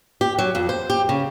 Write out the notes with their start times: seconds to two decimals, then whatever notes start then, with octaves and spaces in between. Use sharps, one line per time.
0.21 G4
0.38 F#3
0.55 F2
0.69 C5
0.90 G4
1.09 C#3